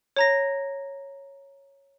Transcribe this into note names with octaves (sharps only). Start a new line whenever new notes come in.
C#5 A#5 A#6